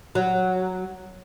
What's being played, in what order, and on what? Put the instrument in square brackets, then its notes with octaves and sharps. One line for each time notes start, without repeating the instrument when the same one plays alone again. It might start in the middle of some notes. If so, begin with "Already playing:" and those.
[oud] F#3